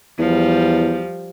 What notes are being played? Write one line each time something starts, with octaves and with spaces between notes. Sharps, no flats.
E2 F3 G3